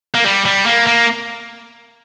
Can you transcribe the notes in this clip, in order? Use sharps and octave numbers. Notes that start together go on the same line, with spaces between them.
A#3
G3
G3
A#3
A#3